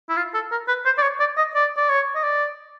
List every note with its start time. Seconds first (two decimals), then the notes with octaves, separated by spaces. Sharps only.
0.09 E4
0.17 F4
0.34 A4
0.51 A#4
0.68 B4
0.85 C5
0.98 D5
1.02 C#5
1.20 D5
1.38 D#5
1.55 D5
1.77 D5
1.89 C#5
2.15 D#5
2.24 D5